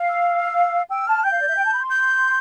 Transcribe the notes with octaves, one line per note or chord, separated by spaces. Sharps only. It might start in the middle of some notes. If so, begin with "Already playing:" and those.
Already playing: F5
E6
G5 E6
A5 F6
G5 G6
F5
D5
E5
G5
A5
B5
C6
G6